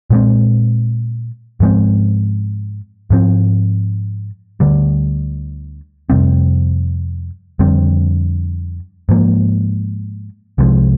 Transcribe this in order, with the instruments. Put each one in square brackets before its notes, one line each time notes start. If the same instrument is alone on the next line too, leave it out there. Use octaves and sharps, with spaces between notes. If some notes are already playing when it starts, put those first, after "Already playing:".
[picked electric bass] A#2 G#3 C4
G#2 F3 G#3 C4
G#2 F3 C4
D2 D3 G3
F2 C3 G3 C4
F2 D3 G3 C4
G#2 F3 A#3
C2 C3 F3 G#3